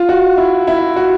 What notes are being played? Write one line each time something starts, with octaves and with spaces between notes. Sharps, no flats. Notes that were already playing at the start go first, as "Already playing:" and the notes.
Already playing: F4
F#4
E4
E4
F#4